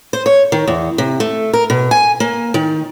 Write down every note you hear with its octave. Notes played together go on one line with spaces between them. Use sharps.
C5
C#5
D#3
E2
C3
A3
A#4
B2
G#5
A#3
D#3